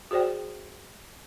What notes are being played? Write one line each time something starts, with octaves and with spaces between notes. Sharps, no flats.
F#4 G#4 C5 D5 G5